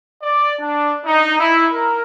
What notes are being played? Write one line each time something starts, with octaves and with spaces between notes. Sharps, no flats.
D5
D4
D#4
E4
A#4